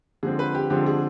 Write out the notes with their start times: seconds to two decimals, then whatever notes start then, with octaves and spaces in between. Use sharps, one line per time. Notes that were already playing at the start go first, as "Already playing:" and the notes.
0.23 D3 F3 G#3 C4 G#4
0.39 B4
0.55 G4
0.70 D3 F3 G#3 C4 G4
0.86 G#4